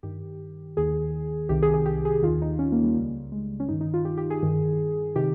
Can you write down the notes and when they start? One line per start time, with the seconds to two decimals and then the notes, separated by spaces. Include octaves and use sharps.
0.03 G2 D#3 G4
0.77 D#2 D#3 G#4
1.49 C2 C3 D#3 G4
1.62 G#4
1.74 G#4
1.86 G4
2.05 G#4
2.23 D#2 D#3 F4
2.42 D#4
2.59 C#4
2.72 A#3
2.84 G3
2.96 C#2 C#3
3.32 G#3
3.60 C#4
3.68 G2 D#3 D#4
3.81 D#4
3.94 F4
4.05 G4
4.18 G4
4.30 G#4
4.43 G2 D#3
5.16 C3 D#3 G4